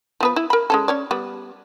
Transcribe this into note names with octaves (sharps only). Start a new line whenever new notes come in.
F3 B3 B4
E4
A#4 B5
G#3 C#4 A4
C#4 C#5 D5
G3 B3